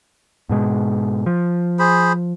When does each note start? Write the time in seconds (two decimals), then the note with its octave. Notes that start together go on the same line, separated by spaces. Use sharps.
0.49 G#2 B2 G#3
1.26 F3
1.79 G#4 C5 B5